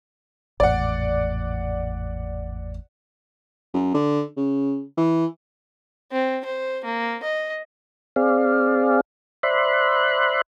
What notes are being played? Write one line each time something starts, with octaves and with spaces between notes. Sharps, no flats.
G#1 E2 A2 D5 F#5
F#2
D3
C#3
E3
C4
C5
A#3
D#5
C4 G#4 D5 F5
C5 D5 E5 B5 C6 F#6